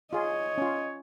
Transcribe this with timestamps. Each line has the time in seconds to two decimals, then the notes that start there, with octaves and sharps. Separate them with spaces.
0.13 F4 G#4 C#5 D#5
0.58 C#4 F4